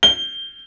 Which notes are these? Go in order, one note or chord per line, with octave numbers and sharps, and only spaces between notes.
G7